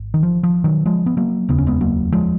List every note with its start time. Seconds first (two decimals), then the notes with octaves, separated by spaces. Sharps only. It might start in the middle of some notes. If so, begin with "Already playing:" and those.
Already playing: G#1
0.14 D#3
0.23 F3
0.43 F3
0.64 D#3 F#3
0.86 F3 G#3
1.06 B3
1.17 F#3 A#3
1.49 F1 D#2 C#3 B3
1.58 C#4
1.67 G#3 B3
1.81 F#3 A#3
2.12 F3 G#3